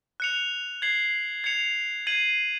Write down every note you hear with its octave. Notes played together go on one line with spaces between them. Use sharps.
F#6 C#7 F7
G#6 C7 F#7
G#6 C#7 F7
G#6 C7 D#7 F#7